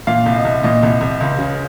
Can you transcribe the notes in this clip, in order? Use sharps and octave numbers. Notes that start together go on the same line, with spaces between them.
A#2 F5
C2
D#5
C2
A#2 D#5
C2
C2
C#2
C#3